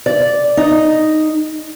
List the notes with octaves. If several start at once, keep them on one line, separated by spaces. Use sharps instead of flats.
D5
D#4